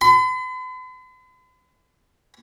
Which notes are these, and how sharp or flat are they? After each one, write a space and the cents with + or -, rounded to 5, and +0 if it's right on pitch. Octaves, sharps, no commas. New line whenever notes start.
B5 +45